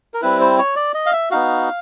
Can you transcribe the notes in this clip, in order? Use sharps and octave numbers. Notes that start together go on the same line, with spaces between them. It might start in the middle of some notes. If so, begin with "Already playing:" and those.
A#4
G3 C4 E4 B4
C5
C#5
D5
D#5
F5
E5
B3 D#4 F#4 F5